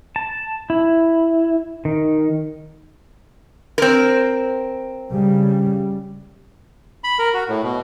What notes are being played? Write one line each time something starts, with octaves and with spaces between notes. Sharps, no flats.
A5
E4
D#3
C4 A#4
C#3 G3
B5
A#4
F#4
A2
B2